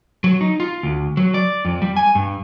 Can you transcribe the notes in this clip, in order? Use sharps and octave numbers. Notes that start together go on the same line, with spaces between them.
F#3
D#4
F4
D2
F#3
D5
F2
G3
G#5
G2